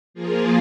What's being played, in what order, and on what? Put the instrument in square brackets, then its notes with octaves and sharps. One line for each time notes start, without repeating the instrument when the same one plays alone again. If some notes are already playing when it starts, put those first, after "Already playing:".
[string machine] F3 A#3 F4 G#4